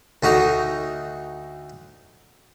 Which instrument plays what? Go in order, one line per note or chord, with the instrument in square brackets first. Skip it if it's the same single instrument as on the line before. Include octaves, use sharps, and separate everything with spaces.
[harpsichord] D2 D#4 F#4 A#5